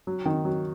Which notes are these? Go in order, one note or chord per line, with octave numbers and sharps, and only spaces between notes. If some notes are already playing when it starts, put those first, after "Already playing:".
F#3
D#3
F#3